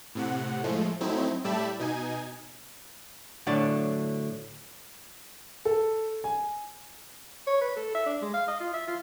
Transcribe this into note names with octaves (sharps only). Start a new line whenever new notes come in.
A2 C3 F#5
A2 F3 G#3 A3
F#3 A3 C4 D#4 E4
A2 G3 G4 E5 A5 B5
B2 D#4 G#5
A2 D3 F#3 D4 D5
A4
G#5
C#5
B4
A4
E5
D4
G#3
F5
D#5
F4
E5
F4